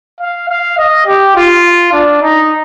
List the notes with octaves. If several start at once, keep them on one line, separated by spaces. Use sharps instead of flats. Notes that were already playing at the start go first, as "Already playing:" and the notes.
F5
F5
D#5
G4
F4
D4
D#4